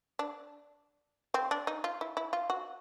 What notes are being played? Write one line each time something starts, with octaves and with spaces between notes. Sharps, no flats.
D4
C4
D4
D#4
F4
E4
E4
F4
F#4